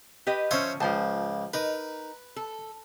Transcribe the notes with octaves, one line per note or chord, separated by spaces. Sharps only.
G4 B4 D#5
F3 C#4 C5 C#5 E5
C#2 F3 C5 A5
D#4 A#4 B4
A4